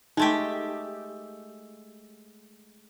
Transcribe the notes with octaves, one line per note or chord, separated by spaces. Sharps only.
G#3 A3 D#4 G4